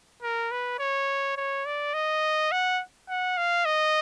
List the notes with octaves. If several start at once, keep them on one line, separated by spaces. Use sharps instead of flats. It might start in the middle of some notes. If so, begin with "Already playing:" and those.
A#4
B4
C#5
C#5
D5
D#5
F#5
F#5
F5
D#5